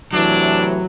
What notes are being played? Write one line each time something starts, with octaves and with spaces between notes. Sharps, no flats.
A2 C3 E3 F#3 D4